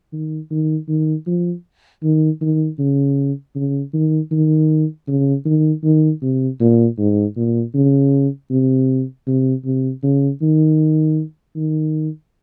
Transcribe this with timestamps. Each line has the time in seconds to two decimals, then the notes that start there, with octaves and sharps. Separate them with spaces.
0.13 D#3
0.51 D#3
0.88 D#3
1.27 F3
2.03 D#3
2.41 D#3
2.79 C#3
3.56 C#3
3.94 D#3
4.32 D#3
5.08 C#3
5.45 D#3
5.84 D#3
6.22 C3
6.60 A#2
6.98 G#2
7.36 A#2
7.75 C#3
8.51 C3
9.27 C3
9.65 C3
10.04 C#3
10.42 D#3
11.56 D#3